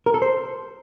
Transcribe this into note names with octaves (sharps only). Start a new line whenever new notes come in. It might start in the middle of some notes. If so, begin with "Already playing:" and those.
A#4
A4
C5